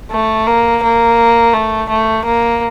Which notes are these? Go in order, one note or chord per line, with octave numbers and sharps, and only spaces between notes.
A3
A#3
A#3
A3
A3
A#3